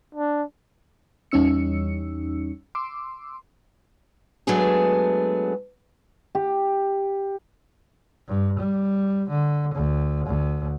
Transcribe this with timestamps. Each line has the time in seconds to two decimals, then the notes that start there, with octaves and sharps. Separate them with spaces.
0.15 D4
1.31 E2 G3 C#4 D#4 E6 C#7
2.75 C6 D6 E6
4.47 F#3 G#3 A3 B3 D4 G#4
6.35 G4
8.28 G2
8.59 G3
9.30 D3
9.75 D2
10.27 D2